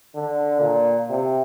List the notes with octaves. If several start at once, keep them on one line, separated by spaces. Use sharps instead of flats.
D3
A#2
C3